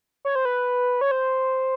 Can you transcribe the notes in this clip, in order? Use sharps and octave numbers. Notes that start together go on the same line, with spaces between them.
C#5
C5
B4
C#5
C5